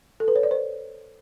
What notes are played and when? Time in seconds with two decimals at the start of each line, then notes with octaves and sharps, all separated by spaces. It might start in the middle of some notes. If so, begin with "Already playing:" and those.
0.20 A4
0.28 B4
0.36 C#5
0.43 D5
0.51 C5